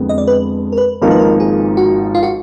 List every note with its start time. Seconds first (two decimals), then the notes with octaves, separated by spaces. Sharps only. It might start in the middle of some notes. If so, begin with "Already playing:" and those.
Already playing: F2 D3 G#3 B3
0.09 D#5
0.18 D5
0.27 B4
0.72 A#4
0.78 B4
1.02 G#1 G#2 F3 A#3 D#4 A#4
1.11 B4
1.19 A#4
1.40 G#4
1.77 F#4
2.15 F4
2.23 F#4